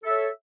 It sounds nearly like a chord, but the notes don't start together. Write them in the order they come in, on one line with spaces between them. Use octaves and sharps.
A4 E5 C#5